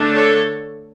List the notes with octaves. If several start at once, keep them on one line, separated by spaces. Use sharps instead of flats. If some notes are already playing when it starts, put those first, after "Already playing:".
Already playing: D3 A3 D4
A4 C#5